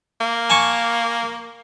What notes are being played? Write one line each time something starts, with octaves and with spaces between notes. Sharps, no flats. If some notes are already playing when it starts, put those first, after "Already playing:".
A#3
G#5 A5 C#6